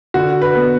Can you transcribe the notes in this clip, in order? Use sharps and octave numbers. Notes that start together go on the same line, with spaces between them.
D3 F#4
B4
B3